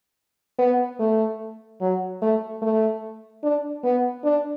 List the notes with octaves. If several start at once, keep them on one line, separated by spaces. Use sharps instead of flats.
B3
A3
F#3
A3
A3
D4
B3
D4